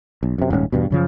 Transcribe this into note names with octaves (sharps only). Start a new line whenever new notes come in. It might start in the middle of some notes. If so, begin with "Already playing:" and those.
B1
F#2 C3
D#1 G#2 C4 C#4
E2 G2 B2
F#2 C#3 F3